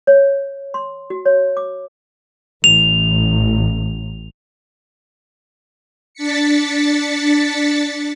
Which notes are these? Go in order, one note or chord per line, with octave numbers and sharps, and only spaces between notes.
C#5
C6
F#4
C#5
D6
A1 F7
D4 A6 B6 C#7